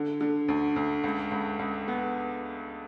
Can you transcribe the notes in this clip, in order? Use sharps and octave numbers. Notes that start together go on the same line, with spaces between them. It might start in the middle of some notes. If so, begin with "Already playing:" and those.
Already playing: D3
D3
D2
D2
C#2
C#2
C#2
B3